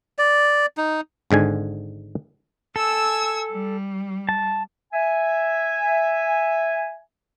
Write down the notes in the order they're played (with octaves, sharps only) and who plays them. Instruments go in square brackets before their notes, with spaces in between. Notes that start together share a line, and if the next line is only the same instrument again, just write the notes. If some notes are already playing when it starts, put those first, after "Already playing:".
[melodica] D5
D#4
[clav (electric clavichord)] G#1 G#2 D3 G#5
[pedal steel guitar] A4 [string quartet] G#5 E6
[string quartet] G3
[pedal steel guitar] A5
[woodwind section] E5 G#5